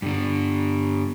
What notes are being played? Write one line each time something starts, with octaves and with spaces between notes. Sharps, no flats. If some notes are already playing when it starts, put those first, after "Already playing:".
G2 D3